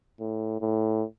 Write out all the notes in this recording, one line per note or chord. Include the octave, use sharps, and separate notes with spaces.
A2
A2